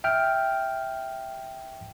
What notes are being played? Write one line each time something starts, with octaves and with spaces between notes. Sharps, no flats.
E5 G5 F6